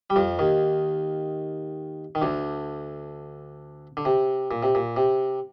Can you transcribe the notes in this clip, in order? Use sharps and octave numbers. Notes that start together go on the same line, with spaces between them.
G3
F2 F3
D#2 D#3
D#3
D2 D3
D3
C3
A#2
C3
A#2
C3